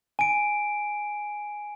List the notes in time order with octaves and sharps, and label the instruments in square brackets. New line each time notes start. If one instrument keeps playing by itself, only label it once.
[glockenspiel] G#5 D7